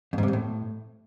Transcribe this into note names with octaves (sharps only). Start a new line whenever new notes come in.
F2
G#2
C3
F2
A2